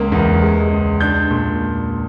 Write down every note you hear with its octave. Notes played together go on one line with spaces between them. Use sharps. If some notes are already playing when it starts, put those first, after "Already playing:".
Already playing: C#2 A#3
E2
G#3
C#2
D4 G6
A#2